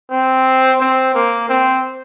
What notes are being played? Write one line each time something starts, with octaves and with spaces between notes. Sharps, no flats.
C4
C4
A#3
C4